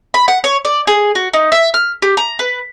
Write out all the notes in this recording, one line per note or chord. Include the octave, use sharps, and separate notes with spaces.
B5
F#5
C#5
D5
G#4
F#4
D#4
E5
F6
G4
A#5
B4